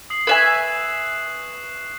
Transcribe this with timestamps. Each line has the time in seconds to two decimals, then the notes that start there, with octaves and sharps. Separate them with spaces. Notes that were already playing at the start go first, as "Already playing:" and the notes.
0.10 D#6 C7 F#7
0.27 B4 E5 G#5 C#6 F#6 E7